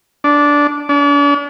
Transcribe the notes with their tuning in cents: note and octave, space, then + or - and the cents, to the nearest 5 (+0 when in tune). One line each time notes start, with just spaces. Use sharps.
D4 -10
D4 -40